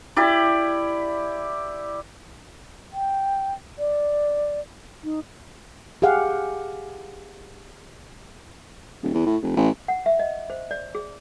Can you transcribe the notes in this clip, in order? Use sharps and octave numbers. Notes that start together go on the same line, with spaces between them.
E4 G4 D5
G5
D5
D#4
G4 G#4 F5 F#5
D#1
E2
A2
F1
A1
F#5
E5
D#5
C5
D5
G#4